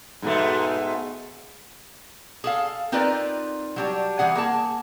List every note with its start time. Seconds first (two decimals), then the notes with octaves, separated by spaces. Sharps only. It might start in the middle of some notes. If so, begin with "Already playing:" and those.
0.22 G#2 B2 A3
2.44 G#4 A4 F5
2.92 C4 D#4 F4 A#4 B4 D5
3.76 F#3 G3 D4
4.19 E3 G3 G#4 F#5
4.35 A#3 G#4 A5